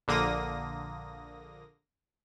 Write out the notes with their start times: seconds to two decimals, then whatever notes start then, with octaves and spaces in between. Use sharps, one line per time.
0.08 A#1 D3 A#3 D#6 A#6